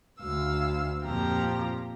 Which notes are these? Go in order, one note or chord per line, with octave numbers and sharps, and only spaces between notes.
D2 F5 E6
F2 A#2 F3 G4 A#5